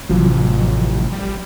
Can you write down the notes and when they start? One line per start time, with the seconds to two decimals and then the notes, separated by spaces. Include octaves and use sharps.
0.10 A1 C3 F3 F#3
1.12 G3